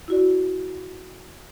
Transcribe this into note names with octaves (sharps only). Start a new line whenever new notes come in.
E4 F#4 D5